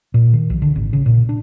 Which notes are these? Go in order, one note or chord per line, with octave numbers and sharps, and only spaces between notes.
A#2
D#3
A#1
D3
G#1
C#3
A#2
D4